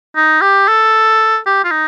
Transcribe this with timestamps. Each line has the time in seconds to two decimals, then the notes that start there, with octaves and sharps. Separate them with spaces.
0.16 D#4
0.41 G4
0.68 A4
1.46 G4
1.64 F4
1.71 D#4